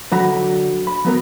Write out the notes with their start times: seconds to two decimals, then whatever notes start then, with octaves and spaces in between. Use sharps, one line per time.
0.12 D3 F#3 F#5 A#5 B5
0.87 B5
1.05 F#3 B3 A#4